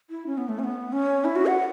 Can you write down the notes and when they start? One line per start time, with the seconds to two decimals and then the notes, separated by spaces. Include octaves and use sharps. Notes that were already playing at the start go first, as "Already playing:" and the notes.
0.10 E4
0.27 C#4
0.38 B3
0.49 A3
0.59 C#4
0.64 B3
0.93 C#4
1.25 E4
1.36 F#4
1.46 F#5
1.57 F#5